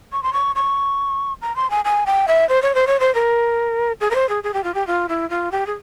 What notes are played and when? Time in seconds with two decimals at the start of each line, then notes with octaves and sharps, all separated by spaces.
0.12 C#6
0.23 C6
0.33 C#6
0.56 C#6
1.42 A#5
1.56 C6
1.70 G#5
1.85 G#5
2.06 G5
2.28 E5
2.49 C5
2.62 C#5
2.75 C5
2.87 C#5
3.00 C5
3.15 A#4
4.01 G#4
4.11 A#4
4.15 C5
4.29 G#4
4.44 G#4
4.54 G4
4.64 F4
4.74 G4
4.87 F4
5.09 E4
5.30 F4
5.52 G4
5.67 G#4